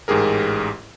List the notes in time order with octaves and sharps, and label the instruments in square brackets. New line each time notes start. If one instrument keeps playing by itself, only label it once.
[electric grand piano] A1 G#2 G4 G#4 A#4